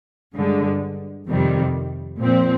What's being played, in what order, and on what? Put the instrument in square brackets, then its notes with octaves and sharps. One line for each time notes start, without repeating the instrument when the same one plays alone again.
[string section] G2 D3 G#3
F2 C3 D#3 G3
A#2 F3 C4